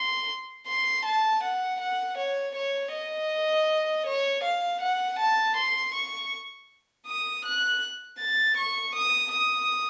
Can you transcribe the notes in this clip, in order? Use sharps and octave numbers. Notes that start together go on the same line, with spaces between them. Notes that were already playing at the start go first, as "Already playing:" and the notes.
Already playing: C6
C6
A5
F#5
F#5
C#5
C#5
D#5
C#5
F5
F#5
A5
C6
C#6
D#6
F#6
A6
C#6
D#6
D#6